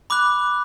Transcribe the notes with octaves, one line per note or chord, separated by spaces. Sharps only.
B5 D6 F#6